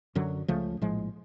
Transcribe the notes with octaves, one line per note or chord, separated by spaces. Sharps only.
F#2 D3 F#3
C#2 C#3 F3 A3
A#1 A2 F3 G#3